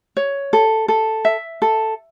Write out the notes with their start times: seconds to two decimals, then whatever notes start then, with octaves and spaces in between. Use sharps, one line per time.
0.17 C#5
0.53 A4
0.88 A4
1.25 E5
1.62 A4